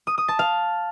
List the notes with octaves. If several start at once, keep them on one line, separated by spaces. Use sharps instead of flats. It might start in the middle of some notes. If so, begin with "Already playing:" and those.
D#6
D#6
A5
F5